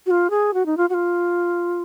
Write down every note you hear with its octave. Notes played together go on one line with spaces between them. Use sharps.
F#4
F4
G#4
F#4
D#4
F4
F#4
F4